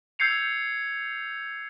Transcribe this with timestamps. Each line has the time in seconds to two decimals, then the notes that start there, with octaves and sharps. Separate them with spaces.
0.19 E6 G6 G#6 C7 C#7 F7